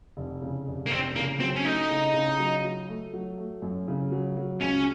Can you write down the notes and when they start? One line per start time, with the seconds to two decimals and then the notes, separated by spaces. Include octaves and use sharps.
0.17 F1
0.42 C#3
0.67 F1
0.86 A#3
0.91 F1 C4
1.15 C#3 A#3
1.40 F#3 C4
1.56 C#4
1.65 A3 D#4
1.90 C#3
2.14 C#3
2.39 F#3
2.64 F#3
2.89 A3
3.13 F#3
3.38 A3
3.62 F#2
3.88 C#3
4.12 F#3
4.37 F#3
4.61 C#2 C#4